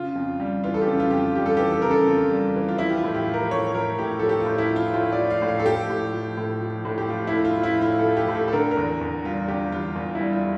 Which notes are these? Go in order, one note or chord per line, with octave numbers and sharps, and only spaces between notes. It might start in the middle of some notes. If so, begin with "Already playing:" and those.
Already playing: C#3 F4
F2
G3
E3 F4
A4
G4
C#3
F4
F2 G4
F4
G3 G4
A4
E3 G4
A4
C#3 A#4
A4
F2 F4
G3
E3
F4
F3 E4
G4
F4
A2
G4
F3
A#4
A2 C#5
F3 A#4
A2 G4
F3 A4
G4
F4
A2
E4
F3
F4
A2 F4
D5
F3
F5
A2
F5
A4
F3 G4
A2
F3
A2
F3
A2
G4
F3 F4
E4
A2
F4
F3
E4
A2 F4
A4
F3
G4
A2
A4
A4
D3 A#4
A#4
E2
E2
G3 F4
D3 G4
E2 F4
E2
G3 E4
F4